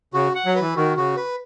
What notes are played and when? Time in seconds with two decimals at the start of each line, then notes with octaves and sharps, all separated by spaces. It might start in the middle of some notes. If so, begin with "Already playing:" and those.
0.14 C#3 F#4
0.35 F#5
0.46 F#3
0.55 E3 B4
0.76 D#3 F#4
0.96 C#3 F#4
1.17 B4